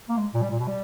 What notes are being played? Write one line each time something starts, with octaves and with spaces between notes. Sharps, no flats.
A#3
G#3
A#2
G3
A#2
B2
G3